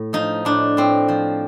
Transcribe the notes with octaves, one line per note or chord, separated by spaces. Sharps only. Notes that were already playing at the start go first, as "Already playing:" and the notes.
Already playing: A2
F3 D#4
A2 D4
A2 C4
F3